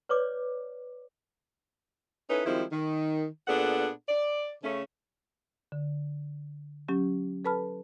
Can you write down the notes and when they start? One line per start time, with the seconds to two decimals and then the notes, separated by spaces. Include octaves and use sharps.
0.09 B4 C#5 D5 D6
2.30 C#4 D#4 E4 A4 B4
2.45 D#3 F3 G3 G#3 C4 E4
2.71 D#3
3.48 A#2 B3 D4 G#4 A4 F#5
4.08 D5
4.63 C#3 A3 C#4
5.72 D3
6.88 F#3 C#4 G4
7.45 A4 B4 A5 B5 F6